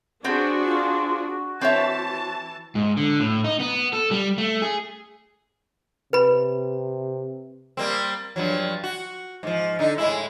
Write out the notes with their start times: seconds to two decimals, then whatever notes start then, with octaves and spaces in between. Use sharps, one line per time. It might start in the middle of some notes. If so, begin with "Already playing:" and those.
0.24 B3 C4 D4 F#4 G#4 C5
0.66 F4
1.26 F#4
1.61 E3 C4 C#5 E5 A5
2.75 G#2
2.97 D3
3.20 A2
3.44 D#4
3.60 B3
3.93 A4
4.11 G3
4.38 A3
4.62 G#4
6.13 C3 B4 B5
7.77 G3 A#3 C4
8.36 G2 F3 F#3
8.84 F#4
9.43 G#2 F3
9.79 D3 D#4
9.98 A2 G#3 E4